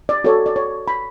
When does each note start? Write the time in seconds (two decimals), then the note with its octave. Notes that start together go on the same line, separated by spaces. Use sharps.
0.09 D5
0.24 F#4 A4 C#5 D5
0.46 D5
0.56 C#5
0.88 B5